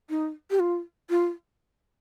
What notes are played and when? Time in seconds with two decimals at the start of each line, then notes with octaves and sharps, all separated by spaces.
0.10 D#4
0.51 G4
0.60 F4
1.10 F4